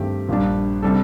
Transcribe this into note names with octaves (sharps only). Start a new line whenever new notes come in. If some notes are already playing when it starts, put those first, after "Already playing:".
Already playing: G2 D#3 A3 C4 G4
A#1 A#2 G3 D4
C3 G3 D4 A4